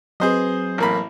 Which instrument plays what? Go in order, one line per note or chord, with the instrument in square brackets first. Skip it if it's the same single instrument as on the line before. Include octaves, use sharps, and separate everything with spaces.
[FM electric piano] F#3 C4 B4 [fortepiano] G#4 C5 D#5
[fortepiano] A1 A#3 B5